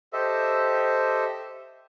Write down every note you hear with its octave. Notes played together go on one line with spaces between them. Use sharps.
G4 A4 C5 D#5 E5